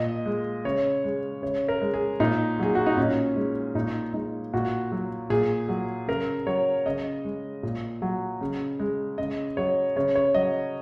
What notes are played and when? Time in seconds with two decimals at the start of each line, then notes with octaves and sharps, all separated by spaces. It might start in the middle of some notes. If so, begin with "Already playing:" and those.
Already playing: A#2 D#5
0.26 G#3
0.65 C#3 C#5
1.04 G#3
1.42 C#3 C#5
1.68 A#4
1.81 G#3
1.94 G#4
2.20 A#2 D#4
2.59 F#3 G#4
2.75 F#4
2.86 D#4
2.97 A#2 C#4
3.36 G#3
3.75 A#2 D#4
4.14 G#3 D#4
4.53 A#2 F#4
4.92 F#3
5.30 A#2 G#4
5.69 F#3
6.08 C#3 A#4
6.46 F#3 C#5
6.86 C#3 D#5
7.25 G#3
7.63 A#2
8.02 F#3
8.41 C#3
8.79 G#3
9.18 C#3 D#5
9.57 F#3 C#5
9.96 C#3 C#5
10.15 C#5
10.34 F#3 D#5